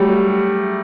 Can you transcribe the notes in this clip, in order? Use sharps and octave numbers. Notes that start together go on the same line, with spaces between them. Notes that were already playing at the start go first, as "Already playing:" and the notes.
Already playing: F#3 G3 A3